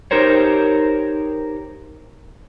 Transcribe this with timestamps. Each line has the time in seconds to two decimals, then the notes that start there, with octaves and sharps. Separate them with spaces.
0.11 D#4 G4 A#4 C5 C#5